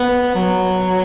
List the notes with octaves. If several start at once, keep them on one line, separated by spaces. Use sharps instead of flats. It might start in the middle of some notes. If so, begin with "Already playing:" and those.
Already playing: B3
F#3